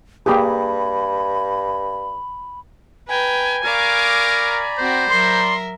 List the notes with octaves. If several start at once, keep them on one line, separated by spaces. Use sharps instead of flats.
G2 A#3 G4 G#4 B5
B4 G5 G#5 A#5
A#4 D5 F5 A#5 B5 C#6 D6
C4 F#4 C5 G5
F#3 A#4 E5 C6